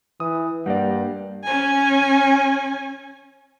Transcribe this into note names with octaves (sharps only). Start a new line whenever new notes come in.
E3 D#6
G2 G3 A#3 D5 F#5
C#4 G#5